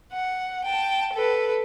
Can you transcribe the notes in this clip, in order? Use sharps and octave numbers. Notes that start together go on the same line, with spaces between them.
F#5
G5 A5
A4 B4